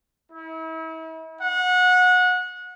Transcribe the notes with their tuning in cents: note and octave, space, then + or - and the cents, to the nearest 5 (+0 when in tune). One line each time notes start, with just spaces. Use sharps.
E4 -40
F#5 -25